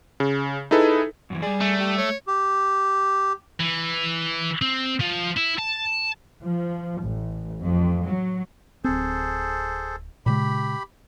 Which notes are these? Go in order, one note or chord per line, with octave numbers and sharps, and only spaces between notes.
C#3
D#4 E4 G#4 A4 B4
F#2 C#3 E3
G3 G#4 D5
A3
G4
C#5
G4
E3
C4
F3
E4
A5
F3
A1
F2
F#3
D1 C4 G#4 A4 C5
A#2 C#3 G#3 G4 B5